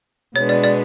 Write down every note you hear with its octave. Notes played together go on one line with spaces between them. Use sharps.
B2 G#3 B3 D4 C#5
D5
D5